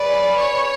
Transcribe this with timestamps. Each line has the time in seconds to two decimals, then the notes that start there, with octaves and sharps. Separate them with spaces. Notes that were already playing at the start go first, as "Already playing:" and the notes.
Already playing: C#4 G#4 B4 D5
0.35 C#5